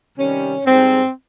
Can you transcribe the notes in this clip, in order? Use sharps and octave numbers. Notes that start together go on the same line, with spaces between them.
C3 D#3 G3 C#4
G#2 G3 C4